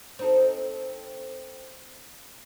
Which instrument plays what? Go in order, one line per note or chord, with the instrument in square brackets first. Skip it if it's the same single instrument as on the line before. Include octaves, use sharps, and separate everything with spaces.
[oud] C4 D#4 A4